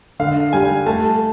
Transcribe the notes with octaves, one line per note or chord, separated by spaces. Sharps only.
D3 F5
G3 G#5
A3 A5